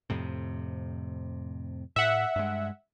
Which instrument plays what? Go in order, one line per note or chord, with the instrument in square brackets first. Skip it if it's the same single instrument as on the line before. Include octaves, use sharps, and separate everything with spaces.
[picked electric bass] F2 A2 C3
[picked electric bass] A2 [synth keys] E5 F#5
[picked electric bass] G2 G#3